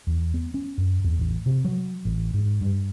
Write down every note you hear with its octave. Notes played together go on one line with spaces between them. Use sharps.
E2
B3
C#4
F#2
E2
A1
C3
F#3
A1
G#2
G2